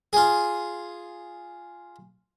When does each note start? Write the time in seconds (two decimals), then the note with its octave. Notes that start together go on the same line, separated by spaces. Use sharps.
0.13 F4 G#4